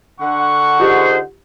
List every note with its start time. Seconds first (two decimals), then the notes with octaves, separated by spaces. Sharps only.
0.20 D3 F#5 C#6
0.80 D#4 F4 G4 G#4 C5